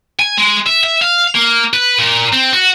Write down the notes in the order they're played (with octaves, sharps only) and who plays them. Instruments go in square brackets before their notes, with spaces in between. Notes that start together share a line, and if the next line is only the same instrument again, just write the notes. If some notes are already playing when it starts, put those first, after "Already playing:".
[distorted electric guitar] G#5
G#3
E5
E5
F5
A#3
B4
A#2
C4
F#4